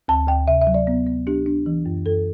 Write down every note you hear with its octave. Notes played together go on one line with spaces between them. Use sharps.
D2 A5
D2 G5
C3 E5
E5
F#3
D5
B3
B3
D4 G4
D4
E3
F#2
F#2 A4